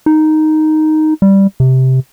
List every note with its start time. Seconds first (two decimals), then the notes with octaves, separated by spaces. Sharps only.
0.06 D#4
1.22 G3
1.60 C3